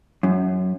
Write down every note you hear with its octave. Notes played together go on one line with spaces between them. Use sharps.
F#2